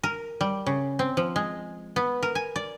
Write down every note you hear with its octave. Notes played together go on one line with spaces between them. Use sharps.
A#4
G3
C#3
C4
F3
G#3
B3
A#4
G#5
D5